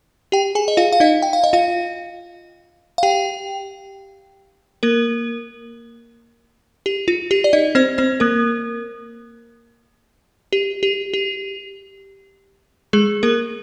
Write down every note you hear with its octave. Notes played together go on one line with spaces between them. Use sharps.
G4 G5
G#4 G#5
D#5
F4 F5
F5
D#4 D#5
G5
F5
D#5
F4 F5
F5
G4 G5
A#3 A#4
G4
F4
G4
D5
D#4 D#5
C4 C5
C4 C5
A#3 A#4
G4
G4
G4
G#3 G#4
A#3 A#4